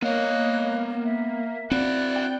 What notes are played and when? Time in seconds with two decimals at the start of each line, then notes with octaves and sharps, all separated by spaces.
0.02 A#3 B3 C#5 D#5 F5 F#6
1.04 E5
1.71 C4 E4 F#4 D5 F#6
2.16 G5